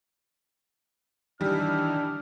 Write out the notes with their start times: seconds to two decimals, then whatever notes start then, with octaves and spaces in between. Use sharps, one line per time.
1.41 D#3 E3 G3 D4 F6